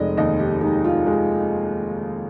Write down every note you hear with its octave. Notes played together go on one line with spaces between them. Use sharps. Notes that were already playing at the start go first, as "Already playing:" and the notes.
Already playing: F1 G#3 D5 D#5
D#2 D#5
G4
G#3 D#4
F4
G#3 D#4